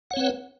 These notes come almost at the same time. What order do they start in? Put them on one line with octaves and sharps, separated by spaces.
F#5 C#5 C4 B4